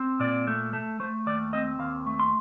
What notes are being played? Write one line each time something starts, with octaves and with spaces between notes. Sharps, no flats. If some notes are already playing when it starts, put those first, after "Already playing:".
Already playing: C4
A#2 D5
A3
A3
A3 C5
D#2 D5
C4 D#5
D#2 F5
A3
C6